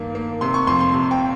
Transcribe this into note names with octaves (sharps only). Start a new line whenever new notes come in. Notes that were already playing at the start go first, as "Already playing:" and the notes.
Already playing: G2 D#3 A#3
A#3
C3 C6
C#6
F2 C6
C6
C3
G5